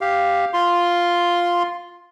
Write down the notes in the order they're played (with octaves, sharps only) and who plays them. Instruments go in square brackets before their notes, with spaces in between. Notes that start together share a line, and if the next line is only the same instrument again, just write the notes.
[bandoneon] G4 F5
F4 C6